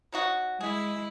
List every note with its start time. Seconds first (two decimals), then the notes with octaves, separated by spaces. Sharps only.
0.12 F#3 D#4 F#4
0.61 G#3 E4 G#4